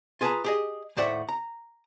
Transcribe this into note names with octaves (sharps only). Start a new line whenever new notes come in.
F4 G#4 B4 G5 A5 A#5
G4 G#4 D#5
D#2 A2 C5 D5 E5 F#5
A#5